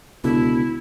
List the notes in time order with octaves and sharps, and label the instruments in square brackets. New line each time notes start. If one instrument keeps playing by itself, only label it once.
[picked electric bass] C#2 B2 D3 [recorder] E4